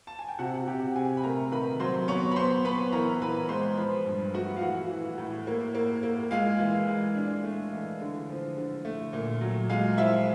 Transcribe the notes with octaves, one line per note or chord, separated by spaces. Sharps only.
A5
G#5
G5
C3 F#4 F#5
C3 G4 G5
C3 G#4 G#5
B5
A3 A#4 A#5
D#3 B4 B5
F#3 C5 C6
B3 C#5 C#6
B5
B3 C5 C6
B3 B4 B5
E3 A#4 A#5
E3 B4 B5
G#3 C5 C6
F3 B4 B5
G2
A3 F#4 F#5
F5
E3 F#4 F#5
E3
A2
A#3
A#3
A#3
G#3 F4 F5
E3
G#3
D4
A3
E3
D3
F3
D3
A3
A#2
F#3
G#3 F4 F5
F3 E4 E5